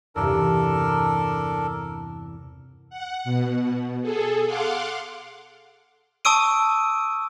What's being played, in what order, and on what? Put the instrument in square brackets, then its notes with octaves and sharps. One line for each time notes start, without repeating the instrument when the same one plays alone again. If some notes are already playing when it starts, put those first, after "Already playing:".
[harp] E2 G2 C3 [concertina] D4 A4 A#4
[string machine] F#5
B2
G#4 A4
F5 F#5 C6 D6
[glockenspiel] A5 C#6 D#6 E6 D7 D#7